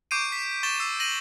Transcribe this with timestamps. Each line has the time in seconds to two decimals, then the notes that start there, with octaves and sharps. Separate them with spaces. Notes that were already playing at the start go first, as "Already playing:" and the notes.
0.11 C#6 D6 G6 C7 D7 D#7
0.32 B6
0.63 C#6 A6 E7 G7
0.80 E6 C7
1.00 A#6 D#7 F#7